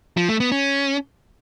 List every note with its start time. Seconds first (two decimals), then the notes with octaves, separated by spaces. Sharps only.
0.17 F3
0.29 A3
0.40 B3
0.52 C#4